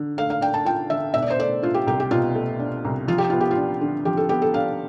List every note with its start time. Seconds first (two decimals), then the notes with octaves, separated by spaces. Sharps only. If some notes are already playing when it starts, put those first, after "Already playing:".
Already playing: D3
0.18 A3 F5
0.30 F5
0.41 D4 G5
0.54 A5
0.65 F4 G5
0.90 D3 E5
1.14 B2 E5
1.22 D5
1.30 C5
1.39 A3 D5
1.62 D4 F4
1.74 G4
1.87 C2 G4
2.00 G4
2.11 B2 F4
2.35 A3
2.60 D4
2.85 C2
3.08 F3 F4
3.18 G4
3.30 B3 F4
3.41 G4
3.51 F4
3.56 D4
3.81 D3
4.05 F3 G4
4.17 A4
4.29 B3 G4
4.42 A4
4.54 D4 F5